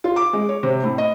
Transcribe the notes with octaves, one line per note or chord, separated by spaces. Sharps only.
F4
D6
G#3
C#5
C3
A2
D#5